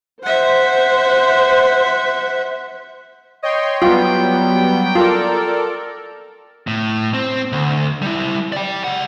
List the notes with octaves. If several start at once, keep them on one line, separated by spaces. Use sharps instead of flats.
C5 E5 F#5
C#5 D#5 G5 C6
F#3 G3 B3 F4 G5
F4 A4 A#4 D5
A2
C4
D2
G3 E4
D5 G5
C#2 F#5